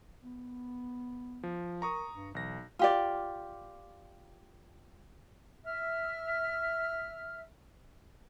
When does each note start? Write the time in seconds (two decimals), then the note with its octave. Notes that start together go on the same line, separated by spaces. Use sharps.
0.22 B3
1.43 F3
1.82 A#4 A#5 C#6 D#6
2.12 G2
2.35 B1 E3 A#6
2.79 F4 G4 D5
5.64 E5 F6